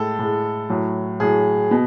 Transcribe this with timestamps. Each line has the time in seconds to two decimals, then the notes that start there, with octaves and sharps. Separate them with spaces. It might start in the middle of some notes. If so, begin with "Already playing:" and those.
Already playing: A2 G#3 A4
0.19 A2 G#3
0.70 A2 F#3
1.20 A2 F#3 G#4
1.71 B2